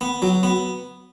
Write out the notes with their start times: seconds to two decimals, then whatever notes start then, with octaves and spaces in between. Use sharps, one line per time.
0.01 B3
0.22 F#3
0.43 B3